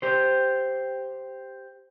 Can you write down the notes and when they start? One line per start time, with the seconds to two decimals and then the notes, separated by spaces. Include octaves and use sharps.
0.02 G4 C5